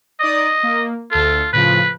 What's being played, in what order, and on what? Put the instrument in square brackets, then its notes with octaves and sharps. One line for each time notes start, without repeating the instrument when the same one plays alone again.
[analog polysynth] D#4 D5 D#6 [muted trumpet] D#5
[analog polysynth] A#3
[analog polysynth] D2 A4 [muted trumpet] F4
[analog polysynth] A2 C#3 F3 [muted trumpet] B4